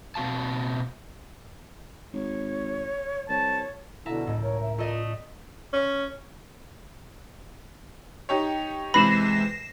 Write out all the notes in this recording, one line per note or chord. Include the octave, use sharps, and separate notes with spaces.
B2 C4 F#4 F5 A5
G#1 C#5
C2 C#5 A5
B2 D3 E4 E5 A5 A#5
C#2 A2 D#5
A#4 C#5
E5
A3 F4 A4 D5 D#5
C#4
D#4 G4 C#5
C3 E3 G#3 B4 B5 A#6 C7 E7